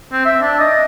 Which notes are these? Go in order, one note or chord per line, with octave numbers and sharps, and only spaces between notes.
C4
E5
D4
D#5